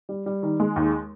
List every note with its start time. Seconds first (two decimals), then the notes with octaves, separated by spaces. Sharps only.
0.09 G3
0.26 G3
0.43 D#3
0.60 G#3
0.76 D#2